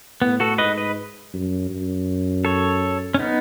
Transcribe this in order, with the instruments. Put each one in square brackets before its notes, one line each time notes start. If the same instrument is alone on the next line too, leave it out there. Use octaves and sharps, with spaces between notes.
[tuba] A2 [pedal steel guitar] B3
[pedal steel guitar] F#4 A4
[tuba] G#2 [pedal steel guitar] B4 D#5
[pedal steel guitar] B4 D#5
[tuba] F#2
F#2
[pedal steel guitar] A4 C#5
C#4
B3 D#4